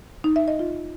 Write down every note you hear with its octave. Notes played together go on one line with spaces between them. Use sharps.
D#4
E5
D#5
F4